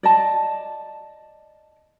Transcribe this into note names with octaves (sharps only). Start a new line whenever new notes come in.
D5 D#5 A5